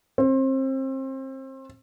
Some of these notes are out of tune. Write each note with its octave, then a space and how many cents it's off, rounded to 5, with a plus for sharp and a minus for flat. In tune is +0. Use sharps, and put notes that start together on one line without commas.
C4 +30